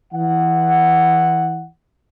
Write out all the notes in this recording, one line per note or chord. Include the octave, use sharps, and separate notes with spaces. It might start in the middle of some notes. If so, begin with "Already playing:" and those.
E3 F#5